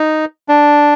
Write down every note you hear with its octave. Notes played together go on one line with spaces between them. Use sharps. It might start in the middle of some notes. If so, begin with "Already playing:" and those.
Already playing: D#4
D4